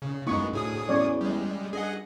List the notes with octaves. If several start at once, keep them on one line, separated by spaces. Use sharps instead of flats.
C#3
A1 F#2 G#3 B3 D#4 C#6
D2 A2 G#4 D#6
E2 C#4 C#5 D5
G3 G#3
G2 G#4 D#5 F#5